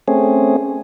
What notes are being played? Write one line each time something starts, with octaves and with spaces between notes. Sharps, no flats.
A3 C4 C#4 G#4